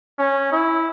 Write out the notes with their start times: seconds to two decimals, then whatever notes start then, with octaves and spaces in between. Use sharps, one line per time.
0.19 C#4
0.52 E4